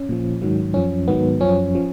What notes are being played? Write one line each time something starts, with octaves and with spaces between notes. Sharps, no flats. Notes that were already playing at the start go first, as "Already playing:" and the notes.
Already playing: C#4
A#2 F3
G#2 D#3 F#3
F#2 F3 C#4
G#2 D#3 F#3 B3
F#2 F3 C#4
F3